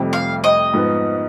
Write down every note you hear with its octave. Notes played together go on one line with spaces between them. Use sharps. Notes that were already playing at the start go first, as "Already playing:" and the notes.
Already playing: F1 F2 C3 G3
F5
D#5
G#2 F3 B3 D#4 B4